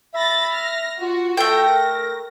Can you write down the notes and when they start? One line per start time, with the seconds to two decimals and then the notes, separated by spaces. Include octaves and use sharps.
0.14 E5 B5 A6 A#6
0.52 F6 A#6
1.00 F4 F#4
1.37 A3 A4 G5 A#6
1.67 A#4